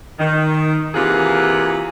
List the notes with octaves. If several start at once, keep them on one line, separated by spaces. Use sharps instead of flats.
D#3
C3 E3 A#3 F4 G#4 F#5